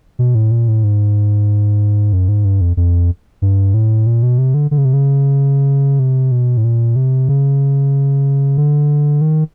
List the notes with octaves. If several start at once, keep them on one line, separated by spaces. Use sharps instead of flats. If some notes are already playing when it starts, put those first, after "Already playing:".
B2
A2
A#2
A2
G#2
F#2
G#2
G2
F2
F2
G2
A2
A#2
B2
C3
D3
D3
C#3
C3
C#3
C3
B2
A2
A#2
C3
C#3
D3
D#3